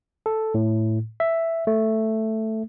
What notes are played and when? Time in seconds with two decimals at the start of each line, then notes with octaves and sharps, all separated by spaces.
0.26 A4
0.54 A2
1.20 E5
1.67 A3